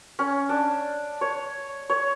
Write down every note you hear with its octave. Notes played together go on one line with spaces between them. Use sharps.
C#4
D4
C#5
C#5